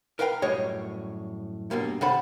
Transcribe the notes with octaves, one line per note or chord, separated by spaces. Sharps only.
A#4 B4 F5 G5 A5 A#5
F#2 A2 G3 G#4 C#5 D#5
G2 B2 A#3
C3 D#3 A4 F#5 B5